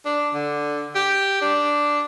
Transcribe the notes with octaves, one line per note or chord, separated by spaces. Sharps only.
D4
D3
G4
D4